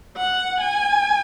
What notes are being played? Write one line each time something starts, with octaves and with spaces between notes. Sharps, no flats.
F#5
G#5